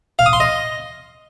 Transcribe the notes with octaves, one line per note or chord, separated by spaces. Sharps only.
F5
D#6
C6
D#5